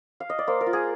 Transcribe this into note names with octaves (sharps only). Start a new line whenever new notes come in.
F5
D#5
D5
A#3 C5
A#4
F4
G#4